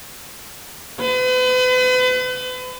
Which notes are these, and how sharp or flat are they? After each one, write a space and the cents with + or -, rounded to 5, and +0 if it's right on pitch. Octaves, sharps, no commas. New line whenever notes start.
B4 +40